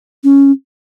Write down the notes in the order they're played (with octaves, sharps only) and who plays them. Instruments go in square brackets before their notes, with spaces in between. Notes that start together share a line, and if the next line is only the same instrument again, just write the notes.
[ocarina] C#4